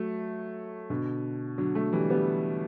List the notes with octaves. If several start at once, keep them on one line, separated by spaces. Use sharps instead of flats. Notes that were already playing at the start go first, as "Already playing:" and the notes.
Already playing: F#3 A3
B2 D3
D3 F#3
F#3 A3
E3 G3
G3 B3